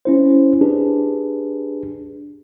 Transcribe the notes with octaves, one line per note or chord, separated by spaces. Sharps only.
C#4 E4 C5
D4 G4 G#4 B4